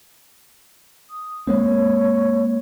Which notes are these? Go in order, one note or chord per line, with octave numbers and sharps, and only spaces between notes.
D#6
G#3 A#3 C4 C#5